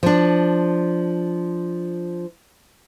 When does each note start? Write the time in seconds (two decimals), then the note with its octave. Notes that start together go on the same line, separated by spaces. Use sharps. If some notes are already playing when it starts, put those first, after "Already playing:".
0.03 F3 D4